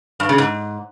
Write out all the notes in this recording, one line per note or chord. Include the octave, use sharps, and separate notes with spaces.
G2
C#3
G#2